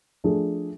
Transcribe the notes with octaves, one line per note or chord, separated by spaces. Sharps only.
F3 A3 D4 G#4